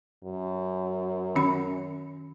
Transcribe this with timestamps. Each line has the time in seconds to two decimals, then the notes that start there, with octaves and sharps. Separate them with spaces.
0.24 F#2
1.36 D#3 C#4 B5